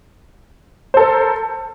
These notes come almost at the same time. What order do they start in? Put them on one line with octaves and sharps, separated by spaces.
C5 A4 A#4